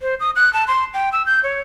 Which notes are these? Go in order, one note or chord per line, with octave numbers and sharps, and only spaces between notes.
C5
D#6
F#6
A5
C6
G5
E6
G6
C#5